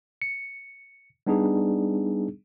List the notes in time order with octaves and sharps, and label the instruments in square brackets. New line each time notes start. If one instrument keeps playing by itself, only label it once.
[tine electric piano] C#7
G3 B3 D4 D#4 G#4